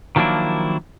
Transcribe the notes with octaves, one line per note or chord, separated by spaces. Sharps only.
D#3 F3 F#3 A#3 D4 E4